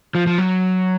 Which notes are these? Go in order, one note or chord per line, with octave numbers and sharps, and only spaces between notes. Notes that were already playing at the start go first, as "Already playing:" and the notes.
F3
F3
F#3